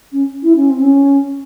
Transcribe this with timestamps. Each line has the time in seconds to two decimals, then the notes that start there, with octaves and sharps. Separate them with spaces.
0.12 C#4
0.42 E4
0.55 C#4
0.69 C4
0.82 C#4